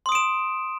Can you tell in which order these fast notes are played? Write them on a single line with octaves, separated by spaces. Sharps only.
C6 D#6 D7 E7